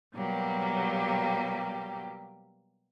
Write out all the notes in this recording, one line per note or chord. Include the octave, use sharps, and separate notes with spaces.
B2 F#3 G3 A#3 G4